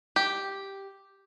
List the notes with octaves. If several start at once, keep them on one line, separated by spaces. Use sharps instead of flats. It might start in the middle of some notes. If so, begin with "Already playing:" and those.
G4